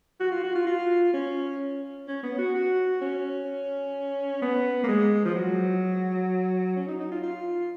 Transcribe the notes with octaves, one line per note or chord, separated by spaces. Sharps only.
F#4
F4
F#4
F4
F4
C#4
C#4
B3
F#4
F#4
C#4
B3
A#3
G#3
F3
F#3
C#4
D#4
D#4
F4
F4